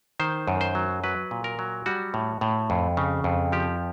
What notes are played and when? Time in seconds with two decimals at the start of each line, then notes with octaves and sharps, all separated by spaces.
0.20 D#3 C5
0.48 F#2
0.61 C5
0.75 F#3
1.04 F#3 B4
1.31 A#2
1.44 A#4
1.59 F#3
1.86 G3 F#4
2.14 A2
2.41 A2
2.70 F2
2.97 C#3
3.24 F2
3.52 F3 G4